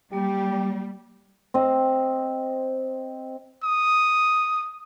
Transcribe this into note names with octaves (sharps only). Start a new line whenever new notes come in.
F#3 G3 A#3 G4 D5
C4 D#5
D#6